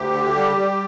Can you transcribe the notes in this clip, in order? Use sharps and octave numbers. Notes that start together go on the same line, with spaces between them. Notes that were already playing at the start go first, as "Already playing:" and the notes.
Already playing: D2 G4
D3
G3
G3